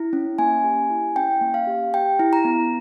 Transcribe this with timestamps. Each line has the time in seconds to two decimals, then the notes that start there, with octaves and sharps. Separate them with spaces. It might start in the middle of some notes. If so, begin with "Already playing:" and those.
Already playing: E4
0.13 C#4
0.38 A#3 G#5
0.64 G4
0.90 E4
1.16 C#4 G5
1.41 A#3
1.54 F5
1.67 G4
1.94 G4 G5
2.20 E4
2.33 A#5
2.45 B3